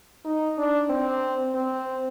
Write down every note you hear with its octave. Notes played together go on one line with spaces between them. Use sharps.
D#4
D4
C4
C4